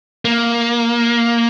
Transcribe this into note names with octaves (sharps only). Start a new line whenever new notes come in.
A#3